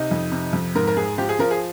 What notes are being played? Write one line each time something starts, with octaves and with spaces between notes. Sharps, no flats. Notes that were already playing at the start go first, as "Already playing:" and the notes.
Already playing: C3 D#4
F2
C3
F2
G#2 A#4
A#4
G#2 G#4
F3 G4
G#4
F3 A#4
G#4